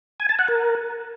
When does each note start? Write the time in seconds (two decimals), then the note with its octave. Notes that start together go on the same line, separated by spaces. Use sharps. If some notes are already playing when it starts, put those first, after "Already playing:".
0.20 G#5
0.29 A5
0.39 F#5
0.48 A#4